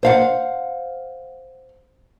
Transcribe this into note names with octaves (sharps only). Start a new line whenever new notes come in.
C5 F5 F#5